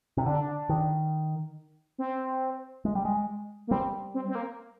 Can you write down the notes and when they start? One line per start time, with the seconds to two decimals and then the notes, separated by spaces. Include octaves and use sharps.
0.17 C3
0.26 D3 D4
0.69 D#3
1.98 C4
2.85 G#3
2.95 G3
3.05 G#3
3.67 A#3
3.71 G3 C4
4.14 C4
4.29 C4
4.35 A#3